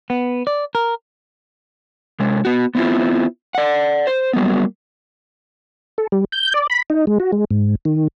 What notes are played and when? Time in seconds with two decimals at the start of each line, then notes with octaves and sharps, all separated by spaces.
0.10 B3
0.47 D5
0.75 A#4
2.20 C3 G#3
2.45 B3 F#4
2.75 B3 C4 E4 F4
3.55 D5 F#5
4.07 C5
4.33 F#3 G3 A#3 B3
5.98 A4
6.12 G3
6.32 G6
6.54 D5
6.70 B5
6.90 D#4
7.07 G#3
7.20 F#4
7.32 G#3
7.51 G#2
7.85 D#3